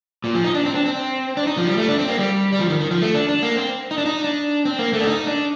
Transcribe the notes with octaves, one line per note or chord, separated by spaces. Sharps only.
A#2
F3
D#4
D4
C4
D4
C4
D4
D#4
F3
G3
A3
D4
C4
A#3
G3
G3
F3
D#3
D#3
F3
A3
D4
D4
A#3
C4
D#4
D4
D#4
D4
C4
A#3
A3
D4
D#4
D4